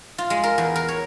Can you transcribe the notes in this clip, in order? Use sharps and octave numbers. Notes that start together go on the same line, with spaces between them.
F4
G#3
A#4
E2
A#4
C#5